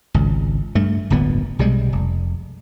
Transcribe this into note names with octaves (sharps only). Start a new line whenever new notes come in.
G#1 C#2
G2 A3
D1 G1 A#2 B3
B1 C3 G3 G#3
F1